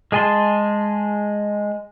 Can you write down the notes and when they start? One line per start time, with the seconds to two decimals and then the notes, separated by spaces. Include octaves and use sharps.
0.12 G#3 G#4 G#5 A5 C6